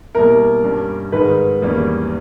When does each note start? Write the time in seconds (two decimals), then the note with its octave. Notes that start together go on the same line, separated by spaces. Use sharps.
0.14 B2 G3 A#3 E4 A#4
0.64 G2 G3 C#4
1.12 G#2 D#3 G#3 D#4 A#4 B4
1.62 E2 D#3 G3 A#3 C#4